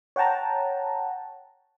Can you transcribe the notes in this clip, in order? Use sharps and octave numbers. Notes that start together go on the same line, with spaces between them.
C#5 F#5 G5 A5 A#5